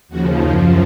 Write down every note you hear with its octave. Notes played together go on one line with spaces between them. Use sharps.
D#2 C#3 F3 F#4
F#2 F3 D#4